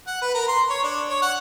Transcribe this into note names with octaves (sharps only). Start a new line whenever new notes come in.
F#5
B4
A#4
C6
C#5
D4
C#5
F#5